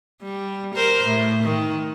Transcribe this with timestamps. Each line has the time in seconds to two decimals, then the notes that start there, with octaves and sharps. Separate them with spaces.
0.22 G3
0.75 A#4 C5
1.07 A2
1.43 D#3